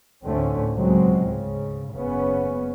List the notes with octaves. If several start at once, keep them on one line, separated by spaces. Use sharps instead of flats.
D2 A2 D3 A3 C4 C#4
C#2 B2 F#3 G#3 C4
G#2 C#3
F#1 C#3 B3 C#4